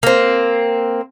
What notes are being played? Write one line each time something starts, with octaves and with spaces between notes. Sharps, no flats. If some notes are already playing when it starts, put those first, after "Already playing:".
A#3 C4